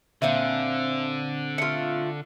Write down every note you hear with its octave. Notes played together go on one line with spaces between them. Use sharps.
A#2 D3 C4 D5 E5 F5 G#5
A3 F4 C#7